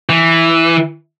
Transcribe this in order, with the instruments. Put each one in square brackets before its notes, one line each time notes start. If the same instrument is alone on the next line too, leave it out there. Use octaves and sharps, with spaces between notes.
[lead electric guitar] E3